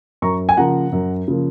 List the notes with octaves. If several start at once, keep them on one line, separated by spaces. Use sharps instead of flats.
F#2 A#5 C#6
G#5
C#3 F3 A#3 F#5 A#5
F#2
C#3 F3 A#3